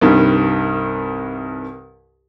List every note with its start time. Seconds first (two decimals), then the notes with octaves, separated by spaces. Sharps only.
0.01 C2 G2 D#3